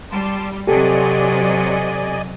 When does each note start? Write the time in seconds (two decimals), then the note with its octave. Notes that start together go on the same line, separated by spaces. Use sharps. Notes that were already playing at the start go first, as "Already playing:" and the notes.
0.11 G3 A5 C6
0.67 C3 F#3 G4 A4 D5 D#5 G#5